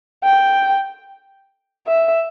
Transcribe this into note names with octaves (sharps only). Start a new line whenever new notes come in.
G5
E5